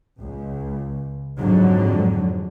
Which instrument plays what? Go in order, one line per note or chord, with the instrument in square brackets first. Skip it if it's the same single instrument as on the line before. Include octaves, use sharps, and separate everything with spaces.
[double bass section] C#2
F2 G#2 D3 F#3